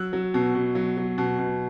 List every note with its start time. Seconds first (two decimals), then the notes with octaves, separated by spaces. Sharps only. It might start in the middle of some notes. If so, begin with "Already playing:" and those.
Already playing: F#3 E6 F#6
0.13 F#3
0.34 B2
0.55 B2
0.75 F#3
0.97 F#3
1.18 B2
1.39 B2